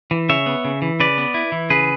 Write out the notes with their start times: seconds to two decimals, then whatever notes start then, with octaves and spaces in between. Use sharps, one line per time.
0.11 E3
0.29 C#3 C#5 E5
0.46 B3
0.65 C#3
0.82 E3
1.00 C#3 B4 D5
1.18 B3
1.34 E4
1.52 E3
1.70 C#3 G#4 B4